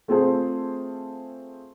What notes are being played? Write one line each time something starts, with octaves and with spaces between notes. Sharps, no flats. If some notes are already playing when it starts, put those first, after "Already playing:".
A3 C4 F4 G#4 A4 C5